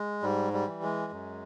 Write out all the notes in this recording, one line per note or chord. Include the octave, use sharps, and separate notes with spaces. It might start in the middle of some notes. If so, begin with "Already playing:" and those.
Already playing: G#3
G#2 G3
G3
E3
G#3
F#2